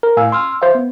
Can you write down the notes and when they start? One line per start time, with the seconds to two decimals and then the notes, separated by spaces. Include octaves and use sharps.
0.03 A#4
0.17 A2 F5 G#5 E6
0.32 C6 E6 F6
0.62 C5 E5 F5
0.75 B3